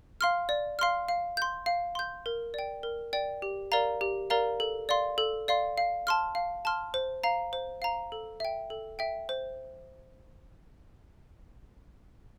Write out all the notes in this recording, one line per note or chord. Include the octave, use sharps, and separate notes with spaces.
F5 C6 F6
D5
F5 C6 F6
F5
C6 G6
F5
C6 G6
A#4
D5 G5
A#4
D5 G5
G4
A#4 D5 F5 A#5
G4
A#4 D5 F5 A#5
A4
D5 F5 C6
A4
D5 F5 C6
F5
A5 C6 F6
F5
A5 C6 F6
C5
F5 A#5
C5
F5 A#5
A4
E5 G5
A4
E5 G5
C5